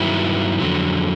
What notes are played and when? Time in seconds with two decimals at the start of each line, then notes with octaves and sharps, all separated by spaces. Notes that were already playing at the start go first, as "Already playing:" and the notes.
Already playing: G2 D#3 F#3 B3 E4
0.60 F2 D3 F#3